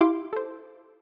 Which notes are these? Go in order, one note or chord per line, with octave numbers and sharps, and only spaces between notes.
E4 G4 F5 C6 D6
A4 C5